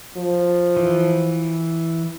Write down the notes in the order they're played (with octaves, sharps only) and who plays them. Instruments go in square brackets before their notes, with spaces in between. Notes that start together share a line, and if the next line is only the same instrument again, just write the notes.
[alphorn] F3
[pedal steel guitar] E3